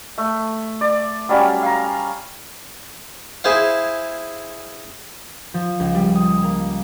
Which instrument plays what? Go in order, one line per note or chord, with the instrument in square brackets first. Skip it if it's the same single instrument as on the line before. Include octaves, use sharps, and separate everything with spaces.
[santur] A3
D5
F#3 G3 C#4 F5
F5 A#5
[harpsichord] E4 G#4 C5 F5
[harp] F3
C#2
G3
D#6
A#3